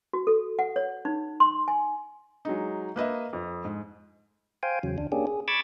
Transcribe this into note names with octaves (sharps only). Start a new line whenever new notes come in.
F#4
A4
F#5
C#5
D#4
C6
G#5
F#3 G#3 D#4
A#3 B4 D#5 E5
F2
G#2
C5 F5 G5 G#5
E2 C#3 F#3
D2 D4
A#3 C#4 D4 G4 G#4
G#4
B5 C#6 D6 E6 G#6 A6